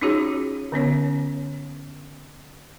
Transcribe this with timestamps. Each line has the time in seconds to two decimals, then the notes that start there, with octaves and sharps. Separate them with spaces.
0.01 C#4 D#4 F4 F#4 G#4 C#5
0.72 D3 B3 C#4 C#5